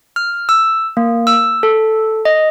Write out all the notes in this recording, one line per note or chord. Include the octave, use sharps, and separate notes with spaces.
F6
E6
A#3
E6
A4
D#5